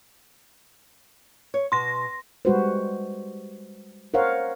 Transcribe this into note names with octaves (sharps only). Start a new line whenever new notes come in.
C#5
B2 C6 A#6
G3 G#3 F#4 B4 C5
A#4 C5 C#5 F5 F#5